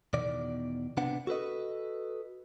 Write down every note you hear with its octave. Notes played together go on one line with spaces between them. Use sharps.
E2 B2 D#3 D5
C3 B3 C4 D4 F#5
F#4 A4 B4 D#5